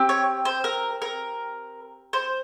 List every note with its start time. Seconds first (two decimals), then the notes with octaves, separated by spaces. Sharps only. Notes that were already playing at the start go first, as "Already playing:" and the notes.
Already playing: C4 G4
0.09 C#5
0.45 C5
0.64 A#4
1.02 A#4
2.13 C5